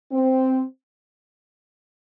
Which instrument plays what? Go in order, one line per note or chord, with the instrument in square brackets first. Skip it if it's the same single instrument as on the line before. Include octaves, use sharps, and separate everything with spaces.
[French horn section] C4